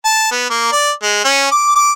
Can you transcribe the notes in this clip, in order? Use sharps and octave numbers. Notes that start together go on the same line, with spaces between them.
A5
B3
A#3
D5
G#3
C#4
D6
D6